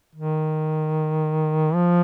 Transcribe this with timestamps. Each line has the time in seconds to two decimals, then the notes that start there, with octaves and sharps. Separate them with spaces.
0.16 D#3
1.74 F3